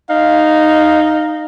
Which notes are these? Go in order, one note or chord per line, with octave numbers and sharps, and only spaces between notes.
D#4 F5